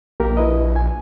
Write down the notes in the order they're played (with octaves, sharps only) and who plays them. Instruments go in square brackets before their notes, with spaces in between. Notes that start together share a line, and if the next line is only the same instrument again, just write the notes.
[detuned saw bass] A#1 [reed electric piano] A#3 G4 A#4
[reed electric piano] E4 B4 D#5
G#5